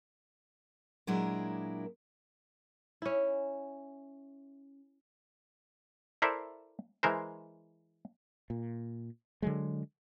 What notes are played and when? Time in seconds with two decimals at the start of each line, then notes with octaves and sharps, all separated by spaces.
1.07 A#2 F#3 G#3 D4 E4 A#4
3.02 C#4 E4
6.22 E4 A4 A#4 C5 D5 E5
7.03 E3 G#3 A#4 C5
8.50 A#2
9.42 D3 F#3 G#3